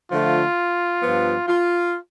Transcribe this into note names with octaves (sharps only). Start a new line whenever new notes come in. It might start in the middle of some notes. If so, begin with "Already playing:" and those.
D3 F3 A3 F4
G2 F3 B3
F4